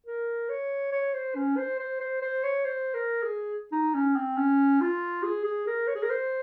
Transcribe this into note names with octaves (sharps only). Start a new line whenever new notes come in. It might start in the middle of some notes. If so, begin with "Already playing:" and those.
A#4
C#5
C#5
C5
C#4
C5
C5
C5
C5
C#5
C5
A#4
G#4
D#4
C#4
C4
C#4
F4
G#4
G#4
A#4
C#5
G#4
A#4
C5